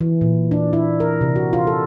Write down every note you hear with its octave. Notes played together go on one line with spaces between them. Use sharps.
E3
A#2
D4
E4
A#4
C3
F#4
F4
A4